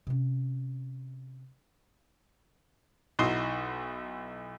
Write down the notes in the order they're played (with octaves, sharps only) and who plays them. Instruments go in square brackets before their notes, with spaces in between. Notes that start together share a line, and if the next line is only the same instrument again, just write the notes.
[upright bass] C3 C#4
[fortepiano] B1 D#4 E4 F#4 C6 D#6